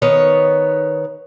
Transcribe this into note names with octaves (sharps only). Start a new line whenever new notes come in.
D#3 B3 C#5